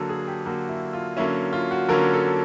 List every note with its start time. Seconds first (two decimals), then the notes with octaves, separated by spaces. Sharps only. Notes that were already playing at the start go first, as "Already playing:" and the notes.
Already playing: D3 F#3 A#3 A4
0.09 G#4
0.27 G4
0.45 D3 F#3 A#3 F#4
0.69 E4
0.93 F4
1.17 D3 F#3 A#3 C#4 E4
1.53 F4
1.71 F#4
1.89 D3 F#3 A#3 C#4 A#4
2.13 A4